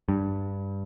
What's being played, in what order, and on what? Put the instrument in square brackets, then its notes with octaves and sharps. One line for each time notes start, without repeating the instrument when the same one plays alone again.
[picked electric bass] G2